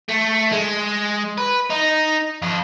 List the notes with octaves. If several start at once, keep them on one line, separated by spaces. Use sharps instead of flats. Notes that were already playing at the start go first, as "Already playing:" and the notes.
A3
G#3
B4
D#4
F2